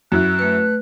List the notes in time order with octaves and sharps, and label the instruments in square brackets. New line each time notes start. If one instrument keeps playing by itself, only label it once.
[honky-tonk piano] F#2 E4 [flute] F#6
[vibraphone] A3 B4